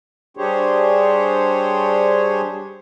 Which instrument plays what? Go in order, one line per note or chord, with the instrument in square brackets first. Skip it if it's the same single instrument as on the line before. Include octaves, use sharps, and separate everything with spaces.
[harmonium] G3 D4 G4 G#4 C5 C#5